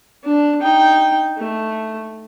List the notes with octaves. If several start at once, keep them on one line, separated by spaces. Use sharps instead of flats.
D4
D#4 G5
A3